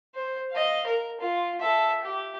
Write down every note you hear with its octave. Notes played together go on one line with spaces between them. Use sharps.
C5
D#5 F5
A#4
F4
A4 E5
G4